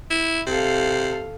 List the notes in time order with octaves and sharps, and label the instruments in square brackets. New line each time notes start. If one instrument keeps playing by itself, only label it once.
[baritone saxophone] E4
[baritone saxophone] C3 [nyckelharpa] A4 F5